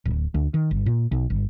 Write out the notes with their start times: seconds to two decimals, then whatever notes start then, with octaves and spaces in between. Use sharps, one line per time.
0.06 D1
0.34 D2
0.54 D#3
0.71 G1
0.86 A#2
1.12 B1
1.30 G1